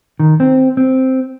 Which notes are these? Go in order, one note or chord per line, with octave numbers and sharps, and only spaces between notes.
D#3
C4
C4